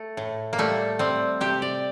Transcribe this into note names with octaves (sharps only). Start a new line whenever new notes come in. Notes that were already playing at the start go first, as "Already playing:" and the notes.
Already playing: A3
A2
A#3
G3 A3
G3 C4
C3 G4
D5